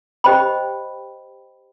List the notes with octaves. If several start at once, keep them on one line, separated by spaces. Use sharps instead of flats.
G4 C5 D#5 G5 B5